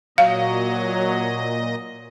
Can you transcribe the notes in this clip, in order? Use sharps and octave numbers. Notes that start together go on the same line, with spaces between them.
A#2 F#3 D#5 F5